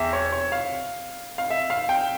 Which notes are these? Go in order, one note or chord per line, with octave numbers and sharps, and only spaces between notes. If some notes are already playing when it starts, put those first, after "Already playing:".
Already playing: E2 E5 G5
C#5
C#5
F5
F5
E5
F5
G5